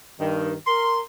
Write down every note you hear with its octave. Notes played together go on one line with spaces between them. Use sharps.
G2 D#3
A#4 C6